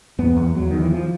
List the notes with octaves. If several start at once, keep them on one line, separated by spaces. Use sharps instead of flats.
E2 B3
E2
E2 F#3
E2 D#3
E3
F3